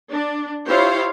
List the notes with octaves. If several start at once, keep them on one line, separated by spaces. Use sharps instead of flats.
D4
E4 F4 G4 C5 C#5 F5